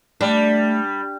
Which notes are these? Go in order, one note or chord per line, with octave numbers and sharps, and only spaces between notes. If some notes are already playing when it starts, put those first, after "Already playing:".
G3 A3 D4